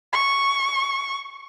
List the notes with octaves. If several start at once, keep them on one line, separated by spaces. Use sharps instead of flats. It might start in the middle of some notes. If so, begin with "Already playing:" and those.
C#6